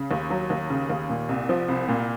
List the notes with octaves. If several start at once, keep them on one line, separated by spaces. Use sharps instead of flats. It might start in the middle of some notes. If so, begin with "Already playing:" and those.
Already playing: C#3
D#2
F#3
D#2
C#3
D#2
A#2
C2
F3
C2
A#2